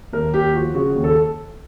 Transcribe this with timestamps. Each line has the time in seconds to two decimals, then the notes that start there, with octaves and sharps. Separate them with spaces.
0.12 D#2 A#4
0.34 D#2 G4
0.54 F3 F#4
0.74 C#3 F#4
0.95 D#2
1.04 A4